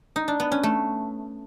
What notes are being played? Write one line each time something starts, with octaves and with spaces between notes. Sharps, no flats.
D#4
D4
B3
C#4
A3